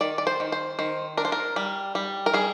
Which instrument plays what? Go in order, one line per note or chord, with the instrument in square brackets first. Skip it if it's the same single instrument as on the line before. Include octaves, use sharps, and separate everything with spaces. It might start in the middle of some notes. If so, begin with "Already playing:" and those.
[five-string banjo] D#3 D5
D5
C5
D#3
C5
D#3 C5
D4 A#4
C5
A#4
G3
G3
A#4
G3 G#4